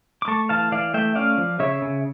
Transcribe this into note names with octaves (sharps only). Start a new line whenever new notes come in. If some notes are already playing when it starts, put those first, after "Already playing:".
D6
A3 A5 C#6
E3 F5 A5
E3 D5 F5
A3 E5 G5
C#4 D5 F5
F3
C#3 C#5 E5
C#3